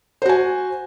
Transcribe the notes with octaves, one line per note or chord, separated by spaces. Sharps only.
F#4 C5 G#5